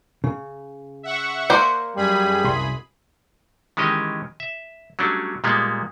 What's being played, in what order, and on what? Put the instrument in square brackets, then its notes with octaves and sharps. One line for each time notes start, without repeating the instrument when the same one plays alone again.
[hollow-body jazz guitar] C#3
[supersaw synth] E5 F#5 C#6
[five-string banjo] A#3 C5 [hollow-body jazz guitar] D5
[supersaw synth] F#2 G#4 B5 [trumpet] G3
[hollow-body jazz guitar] C2 C6
[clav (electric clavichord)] D#3 E3 G#3 C#4 G4 D#5
E5
F#3 G3 A3 C#4 D4
A#2 G3 G#3 A#3 B3